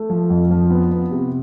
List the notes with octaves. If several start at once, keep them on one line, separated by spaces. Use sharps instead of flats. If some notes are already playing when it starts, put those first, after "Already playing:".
Already playing: A3
F3
F2
F3
B3
B3
C3